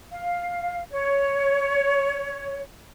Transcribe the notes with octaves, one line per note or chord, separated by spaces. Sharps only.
F5
C#5